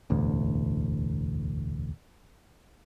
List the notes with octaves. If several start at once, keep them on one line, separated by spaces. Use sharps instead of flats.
E1 A1 D2